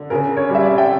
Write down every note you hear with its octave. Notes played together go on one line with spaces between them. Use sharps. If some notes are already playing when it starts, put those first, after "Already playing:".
Already playing: D3
C#3 A#4
C#5
G3 E5
D5
G5